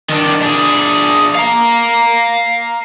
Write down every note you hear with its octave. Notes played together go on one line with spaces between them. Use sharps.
D#3 D4
D4 G#4
F5 A#5